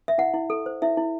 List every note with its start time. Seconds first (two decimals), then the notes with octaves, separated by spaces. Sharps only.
0.08 E5
0.18 E4 F#5
0.34 E4
0.50 A4
0.66 C5
0.82 E4 E5
0.97 E4